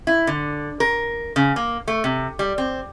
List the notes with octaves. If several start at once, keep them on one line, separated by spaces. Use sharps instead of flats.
E4
D3
A#4
C#3
A#3
A3
C3
G3
C4